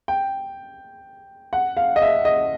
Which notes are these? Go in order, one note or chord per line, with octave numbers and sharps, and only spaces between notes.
G5
F#5
F5
D#5
E5
D#5